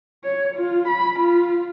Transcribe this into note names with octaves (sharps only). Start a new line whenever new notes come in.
C#5
F4
B5
F4